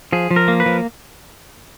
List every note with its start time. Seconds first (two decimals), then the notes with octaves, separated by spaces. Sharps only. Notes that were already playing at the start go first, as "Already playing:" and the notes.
0.13 F3 G#4
0.31 F3
0.36 A#4
0.48 A#3
0.60 B4
0.66 F3